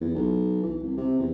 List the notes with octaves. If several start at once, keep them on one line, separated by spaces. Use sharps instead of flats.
E2
B1
E3
C2
C3
E2